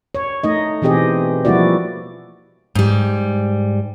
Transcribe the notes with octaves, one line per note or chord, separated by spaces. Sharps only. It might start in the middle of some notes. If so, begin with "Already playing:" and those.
C#5
A3 D#4 D#5
B2 E3 C4 G4 G#4 D#5
F3 G3 A#3 E4 F#4 D5
G#2 G3